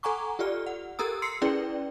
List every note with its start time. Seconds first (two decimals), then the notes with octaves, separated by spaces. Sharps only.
0.03 A4 F#5 G#5 A#5 C#6 D6
0.39 F4 G4 A4 D5 F6
0.66 F#5
0.99 G4 A4 A#4 A#5 D#6 E6
1.22 C6 E6 C7 C#7
1.42 C#4 E4 G#4 B4 D5 G5